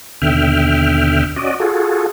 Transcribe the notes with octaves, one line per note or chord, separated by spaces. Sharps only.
D#2 B2 D3 E5 G5 F6
C#4 F#4 D5 D#5
F4 F#4 G#4 A4